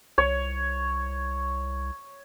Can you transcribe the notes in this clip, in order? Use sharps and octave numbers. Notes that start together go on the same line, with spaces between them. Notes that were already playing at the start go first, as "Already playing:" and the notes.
C2 C#5